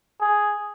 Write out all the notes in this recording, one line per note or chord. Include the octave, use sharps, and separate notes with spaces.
G#4